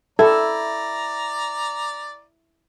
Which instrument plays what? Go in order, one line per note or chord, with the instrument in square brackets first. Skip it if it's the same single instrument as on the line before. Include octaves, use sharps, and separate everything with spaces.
[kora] E4 [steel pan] A4 [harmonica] D5 A#5